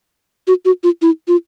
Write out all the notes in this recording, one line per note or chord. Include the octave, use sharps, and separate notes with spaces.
F#4
F#4
F4
E4
F4